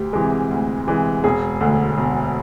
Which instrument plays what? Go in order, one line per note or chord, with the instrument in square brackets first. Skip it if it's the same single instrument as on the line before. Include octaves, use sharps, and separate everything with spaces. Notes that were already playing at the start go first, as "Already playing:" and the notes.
Already playing: [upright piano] D2 G4
C3 E3 G#3
D2
C3 E3 G#3
E1 G#4
D2 D3
E1